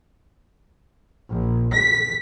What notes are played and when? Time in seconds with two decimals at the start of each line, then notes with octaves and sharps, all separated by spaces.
1.29 A#1
1.74 B6